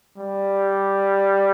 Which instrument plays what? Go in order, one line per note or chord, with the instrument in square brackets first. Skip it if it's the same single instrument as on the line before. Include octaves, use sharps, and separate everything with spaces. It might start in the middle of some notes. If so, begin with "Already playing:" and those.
[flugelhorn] G3